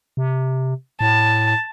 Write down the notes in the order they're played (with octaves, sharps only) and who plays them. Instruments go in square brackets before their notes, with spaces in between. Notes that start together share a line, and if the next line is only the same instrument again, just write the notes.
[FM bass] C3
[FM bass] A2 [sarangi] A5